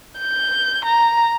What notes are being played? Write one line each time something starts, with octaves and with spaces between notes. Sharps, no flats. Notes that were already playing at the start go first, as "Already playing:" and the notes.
G6
A#5